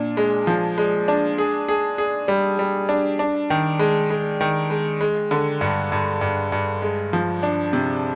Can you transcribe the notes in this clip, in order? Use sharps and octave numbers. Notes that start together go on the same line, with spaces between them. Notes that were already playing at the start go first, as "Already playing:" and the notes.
Already playing: A#2 D4
G#3
F3
G#3
D4
G#4
G#4
G#4
G3
G3
D4
D4
D#3
G#3
G#3
D#3
G#3
G#3
D3
G2
G2
G2
G2
G#3
F3
D4
C3